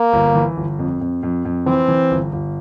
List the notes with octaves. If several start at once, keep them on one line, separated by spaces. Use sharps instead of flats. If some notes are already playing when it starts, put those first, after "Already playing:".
Already playing: A#3
G1
E3
G1
F2
F2
F2
F2
E3 C4
E3
G1
G1